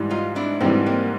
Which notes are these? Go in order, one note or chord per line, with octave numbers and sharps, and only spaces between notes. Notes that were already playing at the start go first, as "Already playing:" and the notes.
Already playing: G#2 E3 G3
D#4 F4
D4 E4
G#2 E3 G3 C4 D4
A#3 C4